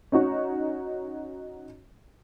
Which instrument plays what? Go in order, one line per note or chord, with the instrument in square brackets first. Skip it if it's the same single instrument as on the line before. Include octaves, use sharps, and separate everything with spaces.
[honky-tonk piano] C#4 D#4 F#4